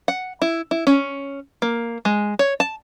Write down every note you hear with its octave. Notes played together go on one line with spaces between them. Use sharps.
F#5
E4
E4
C#4
A#3
G#3
C#5
A5